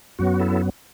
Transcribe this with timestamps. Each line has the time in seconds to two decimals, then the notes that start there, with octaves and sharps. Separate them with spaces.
0.19 F#2 F#3 B3 F#4
0.39 E4 A4